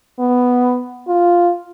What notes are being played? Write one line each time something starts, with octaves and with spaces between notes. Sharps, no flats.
B3
F4